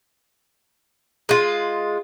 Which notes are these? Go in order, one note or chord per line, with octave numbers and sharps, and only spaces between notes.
G#3 F4